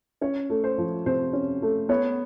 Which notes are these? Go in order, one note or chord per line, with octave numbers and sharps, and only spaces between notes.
C#4 C#5
A3
C5
F3
C3 C5
C#4
A3
B3 C#5